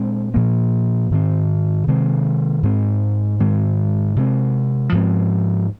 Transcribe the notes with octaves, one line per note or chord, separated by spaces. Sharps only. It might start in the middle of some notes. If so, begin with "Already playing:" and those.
Already playing: A#2 G#3 C4
A#2 F3 A#3
G#2 D#3 C4
C3 D#3 G#3 C4
G#2 G#3 C4
G#2 D#3 G#3 C4
C3 G#3 C4
G#2 F3 G#3 C4